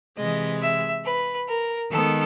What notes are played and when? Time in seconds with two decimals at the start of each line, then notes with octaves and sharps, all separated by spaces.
0.17 C3 E3 G#3 D#5
0.60 E5
1.04 B4
1.48 A#4
1.91 D#3 G#3 B3 A4